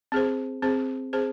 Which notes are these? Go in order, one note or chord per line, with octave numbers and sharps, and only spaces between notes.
C4 G#4 C5
C4 G#4 C5
C4 G#4 C5